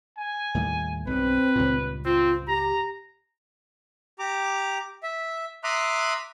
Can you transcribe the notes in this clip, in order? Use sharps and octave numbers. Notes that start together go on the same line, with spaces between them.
G#5
D#2 A2 G3
B1 G2 C4 B4
C#2 G2 A#2
C4 F4
G4 A#5
G4 A#5 D6
E5
E5 A#5 C6 D6 D#6 F#6